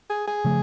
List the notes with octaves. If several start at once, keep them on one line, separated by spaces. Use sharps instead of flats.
G#4
G#4
C#3 F3 A3